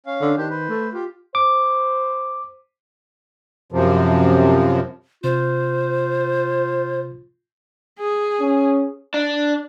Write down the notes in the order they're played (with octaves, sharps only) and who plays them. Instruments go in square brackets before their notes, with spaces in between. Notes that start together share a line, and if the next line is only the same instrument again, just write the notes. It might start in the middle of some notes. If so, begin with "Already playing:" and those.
[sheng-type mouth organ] C#4 F5
[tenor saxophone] D3
[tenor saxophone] D#3 [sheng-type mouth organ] D4 G4 C5
[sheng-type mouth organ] B4 C5
[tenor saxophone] A3
[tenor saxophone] F4 [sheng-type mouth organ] G4
[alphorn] C5 [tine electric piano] D6
[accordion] F#2 C3 F3
[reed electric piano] C3 [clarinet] F4 [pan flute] C5
[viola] G#4
[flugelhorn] C#4
[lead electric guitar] D4